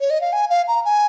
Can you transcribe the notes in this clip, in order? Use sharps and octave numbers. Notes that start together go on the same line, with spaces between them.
C#5
D#5
F5
G#5
F5
A#5
G#5